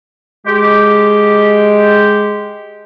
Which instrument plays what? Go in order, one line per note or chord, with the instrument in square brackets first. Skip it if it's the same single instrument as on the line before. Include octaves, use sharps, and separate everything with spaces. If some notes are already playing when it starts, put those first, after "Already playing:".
[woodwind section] G#3 G4